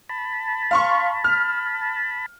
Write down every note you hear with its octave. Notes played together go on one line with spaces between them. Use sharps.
A5 B5
F5 C6 C#6
F6